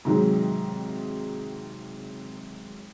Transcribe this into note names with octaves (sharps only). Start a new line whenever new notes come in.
G#2 C3 D#3 F#3 G#3